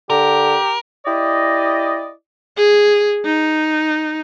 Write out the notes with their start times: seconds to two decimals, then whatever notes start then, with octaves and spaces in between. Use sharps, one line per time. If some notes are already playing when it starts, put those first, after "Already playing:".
0.10 D3 G4 A#4
1.06 E4 G4 D5 D#5
2.57 G#4
3.25 D#4